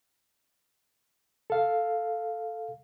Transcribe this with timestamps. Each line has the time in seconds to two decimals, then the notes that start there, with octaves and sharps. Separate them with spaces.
1.50 A4 F5